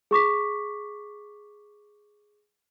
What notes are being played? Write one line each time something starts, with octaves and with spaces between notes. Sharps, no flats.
G#4 C#6 D6 B6